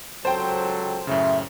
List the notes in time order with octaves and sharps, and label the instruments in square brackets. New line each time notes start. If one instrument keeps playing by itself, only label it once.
[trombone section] C#2 F#3 A4 [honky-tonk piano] C5 G5 [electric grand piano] A5
[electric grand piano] F#2 A2 C#3 [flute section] E5